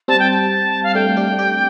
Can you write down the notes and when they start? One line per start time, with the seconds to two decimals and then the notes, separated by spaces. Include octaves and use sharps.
0.08 G3 C4 A5
0.19 G5
0.30 A5
0.83 F5
0.95 A3 D4 G5
1.17 D4 G4
1.39 D4 G4